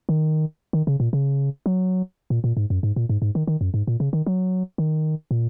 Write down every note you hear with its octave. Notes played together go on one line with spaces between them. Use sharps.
D#3
D#3
C#3
A#2
C#3
F#3
A#2
A#2
G#2
F#2
G#2
A#2
G#2
G#2
D#3
D#3
F#2
G#2
A#2
C#3
D#3
F#3
D#3
A#2